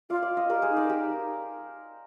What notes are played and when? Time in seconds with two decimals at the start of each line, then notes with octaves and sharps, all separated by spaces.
0.10 F4 D5 F5
0.22 D5 F5
0.29 F4
0.37 C5 D#5
0.49 G4 A#4 D5
0.62 G#4 C5
0.70 D#4
0.77 A#4 D5
0.89 G4 A#4